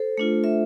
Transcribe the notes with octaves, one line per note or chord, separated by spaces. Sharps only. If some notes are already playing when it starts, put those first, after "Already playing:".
Already playing: A4 C5
A3 D4 F4
E5